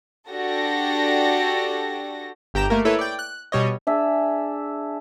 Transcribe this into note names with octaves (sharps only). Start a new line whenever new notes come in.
D4 F#4 G4 A4 A#6
G1 G4 G5 A#5 E7
A3 A#3 A#4
E4 A4 B4 C#5
D5 G5
F#6
B2 G3 C#5 D#5
D4 G#4 E5